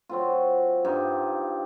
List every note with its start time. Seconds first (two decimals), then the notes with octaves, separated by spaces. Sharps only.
0.09 F#3 C4 F4
0.85 G2 D#4